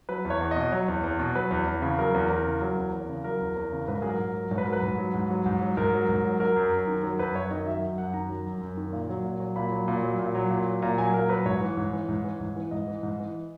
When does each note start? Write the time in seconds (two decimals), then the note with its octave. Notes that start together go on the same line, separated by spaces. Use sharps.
0.09 F#3 B4
0.25 E2
0.30 C#5
0.41 E2
0.51 B2 D#5
0.72 F#3 C#5
0.88 E2
1.03 E2
1.19 B2
1.35 F#3 B4
1.51 E2
1.67 E2
1.82 C#3
1.99 F#3 A#4
2.14 E2
2.30 E2
2.46 C#3
2.61 F#3
2.77 E2
2.92 E2
3.09 C#3
3.24 F#3 A#4
3.41 E2
3.56 E2
3.72 C#3
3.88 G#2 B4
3.95 A#4
4.02 F#3 G#4
4.09 A#4
4.19 G#2
4.35 F#3
4.51 G#2 C#5
4.58 B4
4.65 F#3 A#4
4.73 B4
4.82 G#2
4.98 F#3
5.14 G#2
5.30 F#3
5.46 G#2
5.62 F#3
5.77 G#2 A#4
5.93 F#3
6.09 G#2
6.24 F#3
6.40 F#3 A#4
6.56 F#2
6.72 F#2
6.87 D#3
7.03 F#3 A#4
7.19 F#2 B4
7.35 F#2 C#5
7.51 D#3 D#5
7.66 F#3 E5
7.82 F#2
7.98 F#2 F#5
8.14 D#3 A#5
8.29 F#3
8.46 F#2
8.61 F#2
8.77 D#3
8.93 A#2
9.09 F#3
9.24 A#2
9.40 F#3
9.56 A#2 B5
9.72 F#3
9.88 A#2
10.03 F#3
10.19 A#2
10.35 F#3
10.50 A#2
10.66 F#3
10.82 A#2 A#5
10.98 F#3 G#5
11.14 A#2 A#4
11.29 F#3 B4
11.46 G#2 C#5
11.61 E3
11.77 G#2
11.93 E3
12.08 G#2
12.24 E3
12.40 G#2
12.57 E3
12.71 G#2 D#5
12.87 E3
13.03 G#2
13.19 E3